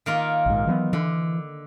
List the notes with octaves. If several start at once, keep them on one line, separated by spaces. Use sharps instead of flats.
D#3 A#3 F4
A#1 G#2
E3 F#3 B3
D3 E3